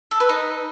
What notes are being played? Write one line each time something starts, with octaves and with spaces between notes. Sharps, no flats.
A4
B4
D#4